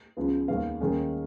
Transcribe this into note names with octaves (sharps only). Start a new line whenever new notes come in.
C#2 C#3 F3 B3
D#2 D#3 G#3 B3 F5
D#2 D#3 G#3 C#4